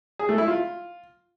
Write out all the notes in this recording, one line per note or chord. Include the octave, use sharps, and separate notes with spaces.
G#4
A3
E4
F4